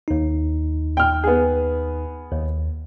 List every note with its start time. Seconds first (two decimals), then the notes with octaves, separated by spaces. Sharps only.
0.08 D#2 D#4
0.97 G5 F6
1.24 B3 G#4
2.31 D#2